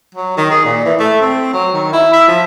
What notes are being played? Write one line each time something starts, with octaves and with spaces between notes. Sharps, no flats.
F#3
D#3
G#4
A#2
E3
A3
C4
F#3
D#3
E4
E5
F3